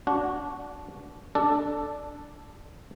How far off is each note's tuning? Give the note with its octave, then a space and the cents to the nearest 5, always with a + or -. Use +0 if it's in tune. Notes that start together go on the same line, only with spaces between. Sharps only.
D4 -20 F#4 +0 F#5 -20
D4 +0 A4 +0